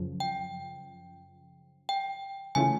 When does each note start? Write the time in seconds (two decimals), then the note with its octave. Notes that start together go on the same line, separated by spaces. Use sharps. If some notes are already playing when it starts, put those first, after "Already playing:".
Already playing: F#2 C#3 F3
0.20 G5
1.89 G5
2.55 C#3 E3 A3 C#4 F4 G#5